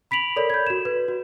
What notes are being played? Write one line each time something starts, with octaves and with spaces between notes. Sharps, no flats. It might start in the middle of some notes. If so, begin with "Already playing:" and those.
B5 B6 D7 F7 F#7
A4 A#4 C#5 D5 B5
G6 G#6
F#4 E7
B4
F#4